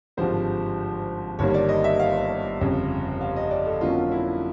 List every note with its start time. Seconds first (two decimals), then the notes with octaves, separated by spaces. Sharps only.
0.17 G#1 G2 D3 F3 G#3 C5
1.39 G1 G2 D#3 G3 A#3 C#5
1.54 D5
1.69 D#5
1.84 E5
1.99 F5
2.61 G1 F2 C#3
3.21 F5
3.36 D#5
3.51 D5
3.66 A4
3.81 F2 D3 F#3 A#3 C#4 F4
4.11 E4